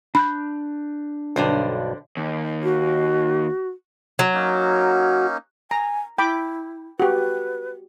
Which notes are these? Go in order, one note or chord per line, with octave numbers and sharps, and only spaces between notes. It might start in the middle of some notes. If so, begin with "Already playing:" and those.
D4 B5 F#6 G6
B1 G2 D3 D4 C5
D#2
F#4
F#3
A#3 C#4 D#4
G#5 A#5
E4 G5 B5 D6
F#4 G4 B4